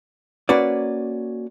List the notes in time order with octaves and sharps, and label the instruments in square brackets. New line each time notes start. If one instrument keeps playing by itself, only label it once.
[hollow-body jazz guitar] A#3 C#4 F#4 B4 D5